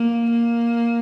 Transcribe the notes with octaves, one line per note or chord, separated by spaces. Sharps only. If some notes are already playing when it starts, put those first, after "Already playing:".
Already playing: A#3
A#3